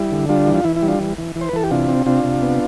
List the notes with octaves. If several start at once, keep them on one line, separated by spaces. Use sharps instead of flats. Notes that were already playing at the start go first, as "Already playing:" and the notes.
Already playing: G3 E4
D3
G3 D4 F4
E3
F4
E3 E4
E4
G3
D4 F4
E3
E3
E3
C5
B4
E3 A4
G4
C3 D4 F4
C4
C3 D4 F4
C3
B3